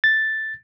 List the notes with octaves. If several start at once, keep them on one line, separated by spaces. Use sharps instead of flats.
A6